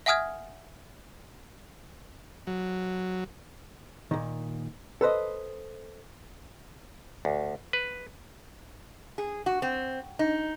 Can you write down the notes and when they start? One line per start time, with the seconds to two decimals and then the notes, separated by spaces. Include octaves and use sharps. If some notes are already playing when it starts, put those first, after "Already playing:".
0.06 E5 F#5 G#5 D#6 F6 G#6
2.47 F#3
4.11 A#2 D#3
5.01 A4 B4 C5 D#5
7.25 D2
7.73 B4
9.18 G#4
9.46 F#4
9.62 C4
10.19 D#4